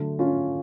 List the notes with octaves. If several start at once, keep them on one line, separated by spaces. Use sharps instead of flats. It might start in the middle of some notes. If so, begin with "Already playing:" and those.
Already playing: D3 F#3 A3
C#4 F4